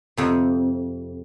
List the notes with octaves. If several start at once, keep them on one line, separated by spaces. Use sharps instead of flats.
F2 C3